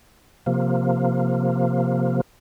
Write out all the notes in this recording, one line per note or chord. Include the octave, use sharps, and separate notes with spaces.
C3 F3 A#3